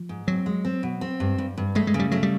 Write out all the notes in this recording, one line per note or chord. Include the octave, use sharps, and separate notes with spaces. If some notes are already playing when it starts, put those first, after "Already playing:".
Already playing: F3
G#2
F#3 C4
G#3
C4
B2
C4
G2
G2
G2
G#3 A3
G#3
C#3
G3
F#3 A3
G3